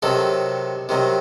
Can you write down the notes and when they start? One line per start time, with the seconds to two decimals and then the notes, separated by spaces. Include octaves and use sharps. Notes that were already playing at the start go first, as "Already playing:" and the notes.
0.02 C3 D#3 F#3 A4
0.89 C3 D#3 F#3